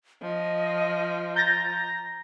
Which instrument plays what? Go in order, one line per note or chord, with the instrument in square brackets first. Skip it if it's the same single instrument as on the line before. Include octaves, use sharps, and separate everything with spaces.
[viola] F3 [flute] D#5
[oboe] A#5 [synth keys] G6 A6 A#6